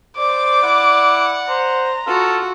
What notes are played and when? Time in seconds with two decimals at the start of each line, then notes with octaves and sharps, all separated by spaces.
0.18 C5 D5 D6
0.63 E4 F#5
1.49 C5 A#5
2.07 F4 F#4 A4